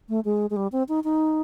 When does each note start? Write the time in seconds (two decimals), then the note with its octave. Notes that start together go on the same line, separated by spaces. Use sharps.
0.09 A3
0.25 G#3
0.50 G#3
0.56 G3
0.72 C4
0.89 D#4
1.04 D#4